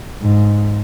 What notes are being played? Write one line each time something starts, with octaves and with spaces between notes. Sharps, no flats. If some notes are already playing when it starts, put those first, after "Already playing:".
G#2